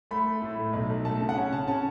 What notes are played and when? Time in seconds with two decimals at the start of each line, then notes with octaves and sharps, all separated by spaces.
0.11 A3 B5
0.26 A3
0.42 A2
0.58 A3
0.73 B1
0.89 B1
1.05 A3 A5
1.20 C#3
1.29 F#5
1.36 C#4
1.52 C#3 A5
1.68 C#4 A5